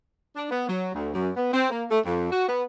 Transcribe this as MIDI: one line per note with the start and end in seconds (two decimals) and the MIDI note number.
0.36 0.46 62
0.50 0.67 59
0.67 0.90 54
0.94 1.12 38
1.13 1.30 42
1.35 1.51 59
1.52 1.66 60
1.71 1.83 58
1.90 1.99 57
2.05 2.29 41
2.31 2.46 66
2.47 2.61 59